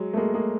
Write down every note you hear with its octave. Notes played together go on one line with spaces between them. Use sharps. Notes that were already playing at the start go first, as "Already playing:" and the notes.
Already playing: F#3 G#3
A3
G#3 A#3
G#3 A#3